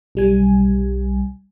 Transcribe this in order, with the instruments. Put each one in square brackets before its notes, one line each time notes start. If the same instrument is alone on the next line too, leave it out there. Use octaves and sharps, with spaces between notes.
[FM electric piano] B1 G3 G#5